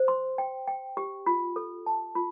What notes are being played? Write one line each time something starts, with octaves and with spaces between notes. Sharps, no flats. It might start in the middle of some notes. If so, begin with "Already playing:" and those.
Already playing: C5
C6
G5
G5
G4
F4
A4
A5
F4